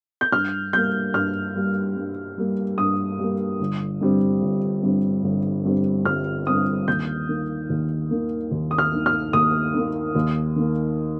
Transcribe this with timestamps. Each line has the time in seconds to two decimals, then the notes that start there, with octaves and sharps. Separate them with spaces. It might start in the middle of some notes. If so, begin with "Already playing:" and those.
0.21 G6
0.32 G2 F6
0.73 G3 A#3 G6
1.14 G2 F6
1.55 G3 A#3
1.96 G2
2.38 G3 A#3
2.78 G2 D#6
3.19 G3 A#3
3.60 G1
4.01 G2 G3 C4
4.42 G1
4.83 G2 G3 C4
5.24 G1
5.65 G2 G3 C4
6.05 G1 F6
6.46 G2 G3 C4 D#6
6.88 D#2 G6
7.29 D#3 A#3
7.70 D#2
8.10 D#3 A#3
8.51 D#2
8.71 D#6
8.78 F6
8.93 D#3 A#3
9.06 F6
9.33 D#2 D#6
9.74 D#3 A#3
10.15 D#2
10.56 D#3 A#3